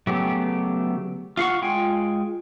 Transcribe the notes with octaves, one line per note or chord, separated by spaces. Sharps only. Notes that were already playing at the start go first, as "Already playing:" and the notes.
C#3 F#3 A3 B3 G4
F4 F5 F#5 C#6
G#3 F4 G5 G#5